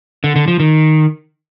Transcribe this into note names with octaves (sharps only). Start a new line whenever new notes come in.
D3
D3
F3
D#3